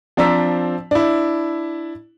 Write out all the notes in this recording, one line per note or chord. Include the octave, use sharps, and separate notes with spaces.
F3 C4 D4 A#5 E6 B6
D4 E4